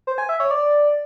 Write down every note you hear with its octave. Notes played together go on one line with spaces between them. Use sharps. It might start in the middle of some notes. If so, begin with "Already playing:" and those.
C5
G#5
E5
C#5
D5